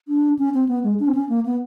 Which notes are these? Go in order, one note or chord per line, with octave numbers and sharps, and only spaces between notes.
D4
C#4
C4
B3
G#3
D4
C4
C#4
A#3
B3